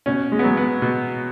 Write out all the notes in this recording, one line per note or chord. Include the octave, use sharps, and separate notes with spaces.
B2 C#4
G#3
B3
F#3 G#3
B3
B2